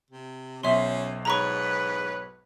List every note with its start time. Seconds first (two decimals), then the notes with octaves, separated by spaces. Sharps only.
0.11 C3
0.63 B1 B2 C#4 C5 E5 C6
1.25 G#2 B4 C#5 A#5 B5 C#6